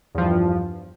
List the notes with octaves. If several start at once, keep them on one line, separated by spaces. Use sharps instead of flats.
E2 G2 F3